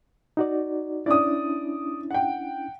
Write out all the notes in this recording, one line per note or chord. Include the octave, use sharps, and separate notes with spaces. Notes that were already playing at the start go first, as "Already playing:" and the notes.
D#4 F#4 D5
C#4 D4 E4 D5 D#6
F#5 G5